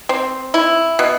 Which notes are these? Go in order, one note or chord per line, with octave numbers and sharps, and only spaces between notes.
C4
E4
B2